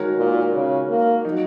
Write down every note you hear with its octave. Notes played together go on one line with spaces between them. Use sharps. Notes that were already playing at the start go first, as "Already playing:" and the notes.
Already playing: D#3 G#3 F#4 A#4 C#5
A#2
C#3
A#3
F#3 D#4